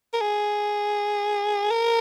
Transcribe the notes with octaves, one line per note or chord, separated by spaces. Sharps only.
A#4
G#4
A#4